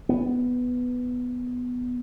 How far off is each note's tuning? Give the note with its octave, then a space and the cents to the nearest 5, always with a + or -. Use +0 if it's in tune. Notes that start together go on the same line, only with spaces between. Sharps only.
B3 +5